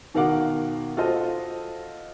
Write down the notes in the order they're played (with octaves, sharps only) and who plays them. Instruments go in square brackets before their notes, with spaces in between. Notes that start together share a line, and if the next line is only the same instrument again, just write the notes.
[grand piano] B2 D#3 A#4 F5 F#5 D6
F4 F#4 A4 C5 D#5